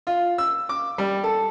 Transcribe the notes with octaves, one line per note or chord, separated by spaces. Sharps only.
F4
E6
D6
G3
A4